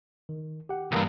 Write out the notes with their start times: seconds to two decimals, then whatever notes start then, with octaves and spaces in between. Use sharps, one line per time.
0.29 D#3
0.69 G4 F#5
0.92 C2 G2 E3 A#3 A#5